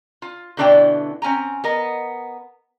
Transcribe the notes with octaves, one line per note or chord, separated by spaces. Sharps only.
F4
B2 D3 E3 D4 D5 G5
C4 C#4 G#5 A#5
B3 A#4 D#5